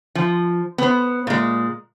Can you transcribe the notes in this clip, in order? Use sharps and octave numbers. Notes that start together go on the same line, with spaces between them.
F3
B3 C5
A#2 G#3